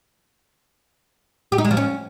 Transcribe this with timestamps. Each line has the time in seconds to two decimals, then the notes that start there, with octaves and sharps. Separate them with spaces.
1.52 G4
1.58 D#4
1.64 G#3
1.71 F3
1.77 C#4